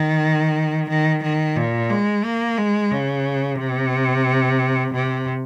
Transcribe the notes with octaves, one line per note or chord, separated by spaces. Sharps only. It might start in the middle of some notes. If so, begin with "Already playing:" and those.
Already playing: D#3
D#3
D#3
A#2
G#3
A#3
G#3
C#3
C3
C3